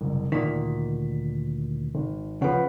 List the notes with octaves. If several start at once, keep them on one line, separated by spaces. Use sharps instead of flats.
F#1 C2
D2 A#2 D#3 B6
G#1
C#3 F3 B4 F#5